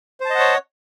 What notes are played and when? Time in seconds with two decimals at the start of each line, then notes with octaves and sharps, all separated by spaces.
0.20 C5
0.25 A5
0.30 D#5
0.35 F#5
0.39 C#5